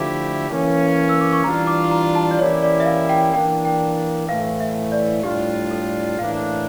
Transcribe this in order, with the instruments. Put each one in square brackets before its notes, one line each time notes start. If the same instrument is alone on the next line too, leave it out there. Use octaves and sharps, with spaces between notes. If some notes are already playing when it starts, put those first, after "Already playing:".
Already playing: [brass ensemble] D3 F3 A3 E4 G4
E3 A#3 C#4
[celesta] E6
D6
C#6
[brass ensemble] E3 G3 D4 F4 [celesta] A#5
[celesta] D6
A#5
A5
D5
[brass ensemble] E3 A#3 C#4 E4 G4 [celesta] C#5
[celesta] D5
E5
F5
G5
[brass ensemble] E3 A#3 D4 [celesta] G5
[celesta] G5
[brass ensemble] A2 E3 A3 [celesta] F5
[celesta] E5
D5
[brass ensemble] A2 G3 D4 F4 [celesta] G4
[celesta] A4
[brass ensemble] A2 E3 A#3 D4 [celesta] F5